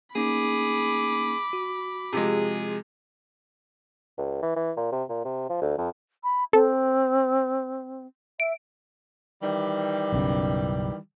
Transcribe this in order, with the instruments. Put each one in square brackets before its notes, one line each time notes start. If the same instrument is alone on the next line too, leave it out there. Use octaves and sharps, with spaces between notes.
[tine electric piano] A#3 C#4 D#4 [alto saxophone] G#4 [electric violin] B5 D6
[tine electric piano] F#4
[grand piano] C3 F3 G#3 [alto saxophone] G#4
[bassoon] C#2
E3
E3
A#2
C3
A#2
C3
F3
D2
F2
[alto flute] B5
[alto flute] C4 [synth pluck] A4
[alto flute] E5 [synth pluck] D7
[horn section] D#3 E3 G3
[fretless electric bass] B1 F#2 C#3